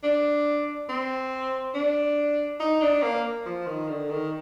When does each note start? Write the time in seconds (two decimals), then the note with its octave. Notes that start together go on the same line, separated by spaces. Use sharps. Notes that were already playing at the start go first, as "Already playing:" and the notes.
0.03 D4
0.89 C4
1.74 D4
2.60 D#4
2.82 D4
3.03 A#3
3.46 F3
3.67 D#3
3.89 D3
4.10 D#3